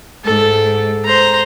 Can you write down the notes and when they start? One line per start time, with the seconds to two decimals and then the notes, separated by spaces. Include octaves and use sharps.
0.25 G#2 A4
1.05 C5 A#5